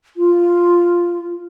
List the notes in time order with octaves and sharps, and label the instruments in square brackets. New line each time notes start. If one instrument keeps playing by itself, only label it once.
[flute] F4